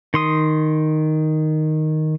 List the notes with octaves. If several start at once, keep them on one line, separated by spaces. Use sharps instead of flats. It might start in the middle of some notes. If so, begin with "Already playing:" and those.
D#3 C6 D#6